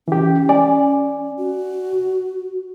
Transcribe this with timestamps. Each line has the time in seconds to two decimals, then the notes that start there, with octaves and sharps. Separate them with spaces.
0.08 E3 C#4 G4
0.49 D5 G#5
1.37 F#4